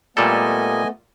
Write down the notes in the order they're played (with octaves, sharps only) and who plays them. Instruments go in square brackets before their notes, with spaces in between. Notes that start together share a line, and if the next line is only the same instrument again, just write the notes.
[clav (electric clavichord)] A#2 G3 A4 [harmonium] A3 B3 [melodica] D#5 G#5